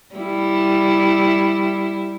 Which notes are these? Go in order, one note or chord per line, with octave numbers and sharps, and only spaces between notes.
G3 E4